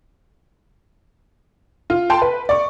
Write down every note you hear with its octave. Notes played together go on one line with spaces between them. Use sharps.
F4
G5 A5 C6
B4
D5 C#6